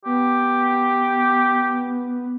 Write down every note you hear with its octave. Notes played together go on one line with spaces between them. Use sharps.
B3 G4